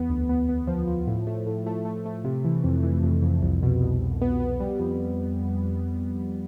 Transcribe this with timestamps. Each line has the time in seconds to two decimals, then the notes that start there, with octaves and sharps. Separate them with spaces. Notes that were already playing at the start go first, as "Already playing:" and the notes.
Already playing: E2 B3
0.09 D2
0.29 B3
0.49 B3
0.67 F3
0.87 F3
1.07 A2
1.27 A3
1.46 A2
1.66 A3
1.85 A3
2.06 A3
2.24 C3
2.45 E3
2.64 F2
2.83 E3
3.03 F2
3.22 F2
3.42 C2
3.62 B2
3.81 C2
4.01 C2
4.21 B3
4.40 B3
4.60 G3
4.79 F2